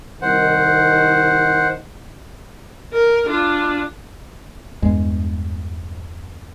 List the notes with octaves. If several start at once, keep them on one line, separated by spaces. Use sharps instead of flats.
C2 D#3 C5 F#5
A#4
D4 F4
E2 G2 G#3